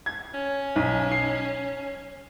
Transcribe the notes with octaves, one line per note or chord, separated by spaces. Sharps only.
G#6
C#4
B1
C7